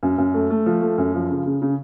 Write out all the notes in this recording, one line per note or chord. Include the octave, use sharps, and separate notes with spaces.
F#2
F#2
A3
A3
F3
A3
F#2
F3
C#3
C#3
C#3